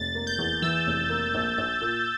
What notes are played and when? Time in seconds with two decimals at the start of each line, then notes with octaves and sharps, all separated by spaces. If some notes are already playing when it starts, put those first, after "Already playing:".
Already playing: F1 A6
0.15 A#3
0.27 G6
0.39 E2
0.62 E3 E6
0.87 F1
1.09 A#3
1.34 A#1
1.58 A#1
1.81 A#2